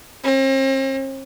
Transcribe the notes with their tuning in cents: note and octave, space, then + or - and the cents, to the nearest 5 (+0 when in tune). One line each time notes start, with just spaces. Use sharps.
C4 +40